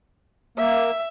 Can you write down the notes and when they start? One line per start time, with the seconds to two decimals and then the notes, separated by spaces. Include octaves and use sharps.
0.58 A#3 E5